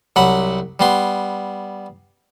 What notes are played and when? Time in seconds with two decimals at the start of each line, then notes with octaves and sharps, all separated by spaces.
0.16 C2 F#3 F#5 B5
0.79 G3 B3 C6